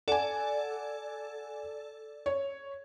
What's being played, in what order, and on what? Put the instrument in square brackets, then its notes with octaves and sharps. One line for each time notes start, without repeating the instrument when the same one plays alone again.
[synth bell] A4 D5 [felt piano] F#5 G#5
[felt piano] C#5